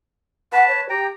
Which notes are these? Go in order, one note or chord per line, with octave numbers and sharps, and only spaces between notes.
B4 F#5 A5
C#5
G4 G5 A#5